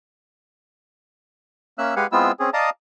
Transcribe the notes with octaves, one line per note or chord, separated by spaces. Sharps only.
A#3 C#4 E5 E6 F#6
G#3 G4 B4 F5 F#5 G#5
G#3 B3 C4 E4 F4 E6
C4 C#4 G#4
D5 D#5 F5 A5 A#5 D#6